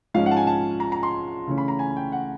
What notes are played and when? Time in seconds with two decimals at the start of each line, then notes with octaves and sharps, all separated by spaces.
0.14 G#2 F3 G#3 C#4 F5
0.26 F#5
0.31 A5
0.37 G#5
0.47 A5
0.80 A#5
0.92 A#5
1.03 C6
1.47 C#3 E3 A3 C#4
1.58 B5
1.68 A#5
1.79 G#5
1.97 G5
2.12 F#5